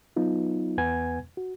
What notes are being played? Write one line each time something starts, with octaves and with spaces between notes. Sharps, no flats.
F#3 B3 D#4 F4
E2 B3 B4 F#5 G#5 G#6
F#4